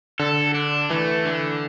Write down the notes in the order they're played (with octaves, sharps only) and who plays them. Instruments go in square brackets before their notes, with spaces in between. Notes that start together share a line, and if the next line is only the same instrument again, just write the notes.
[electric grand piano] D3 [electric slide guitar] A4
[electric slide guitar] D4
[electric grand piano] E3 [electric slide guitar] A3
[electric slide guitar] D3